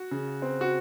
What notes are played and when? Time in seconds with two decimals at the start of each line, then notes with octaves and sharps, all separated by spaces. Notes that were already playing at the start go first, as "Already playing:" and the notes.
Already playing: F#4
0.11 C#3
0.42 C4
0.61 F#4